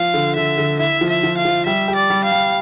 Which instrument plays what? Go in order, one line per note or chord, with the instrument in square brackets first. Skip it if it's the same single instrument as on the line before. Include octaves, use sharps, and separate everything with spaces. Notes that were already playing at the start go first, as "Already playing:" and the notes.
Already playing: [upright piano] F3 [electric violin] F5
[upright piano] D3
[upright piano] D3 [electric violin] E5
[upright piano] D3
[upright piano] E4 [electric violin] E5
[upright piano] F3
[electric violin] E5
[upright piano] F3
[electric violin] F5
[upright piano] F3
[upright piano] G3 [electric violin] E5
[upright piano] G4
[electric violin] D5
[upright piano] G3
[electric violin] F5
[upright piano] G3